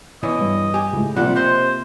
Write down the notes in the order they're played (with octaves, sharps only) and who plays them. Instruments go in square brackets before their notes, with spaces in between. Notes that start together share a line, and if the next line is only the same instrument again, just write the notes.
[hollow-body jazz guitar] B2 E3 C#4 [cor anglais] D#5
[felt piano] G2
[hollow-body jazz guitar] G4 G#5
[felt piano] C#2 A2
[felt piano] C3 A#3 F4 [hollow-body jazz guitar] F3 G3 C4 [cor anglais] F#5
[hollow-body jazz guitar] G4 D#5 C6 [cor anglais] C5